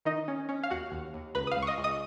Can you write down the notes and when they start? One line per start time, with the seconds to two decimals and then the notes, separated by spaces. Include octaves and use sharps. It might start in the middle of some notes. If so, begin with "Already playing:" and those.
0.05 D#3 D#4 D#5
0.28 C#4
0.49 C#4
0.63 F5
0.71 D#2 F#4 F#5
0.92 D#2
1.14 D#2
1.35 C#2 B4 B5
1.47 D#6
1.51 F5 F6
1.57 C#2
1.62 C#6
1.67 D#5 D#6
1.78 C#2
1.84 D#5 D#6